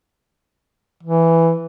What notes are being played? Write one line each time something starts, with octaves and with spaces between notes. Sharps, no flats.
E3